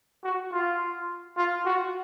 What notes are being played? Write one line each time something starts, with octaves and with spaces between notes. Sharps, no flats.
F#4
F4
F4
F#4